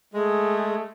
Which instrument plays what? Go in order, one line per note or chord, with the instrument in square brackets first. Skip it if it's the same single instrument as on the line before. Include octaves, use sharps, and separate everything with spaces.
[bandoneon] G#3 [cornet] A3 [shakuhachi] G#4